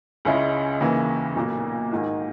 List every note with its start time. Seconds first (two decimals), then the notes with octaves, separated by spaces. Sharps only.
0.25 C#2 C#3 G#3 C#4 E4
0.81 D#2 C#3 E3 A#3
1.36 B1 A#2 A#3
1.92 G#2 D#3 A#3